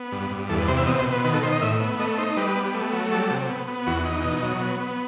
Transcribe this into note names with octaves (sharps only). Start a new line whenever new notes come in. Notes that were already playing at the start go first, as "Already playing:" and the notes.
Already playing: B3
G2
G2
E2 A4
B4
C3 C5
E5
B2 D#5
C5
B2
B4
D#3 B4
A4
D#3 C5
D#5
A2 E5
B3
A3 D#5
D#4 C5
G3 B4
B3
A3
F#3
G3 A4
C3
B3
B3
E2 F#4
D#4
B2
F#3
B3
B3